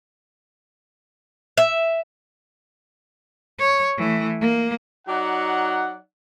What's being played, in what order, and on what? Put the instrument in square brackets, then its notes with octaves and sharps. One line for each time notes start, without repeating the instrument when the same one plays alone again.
[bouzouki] E5
[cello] C#5
E3 A3
A#3
[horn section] F#3 D#4 D5 F#5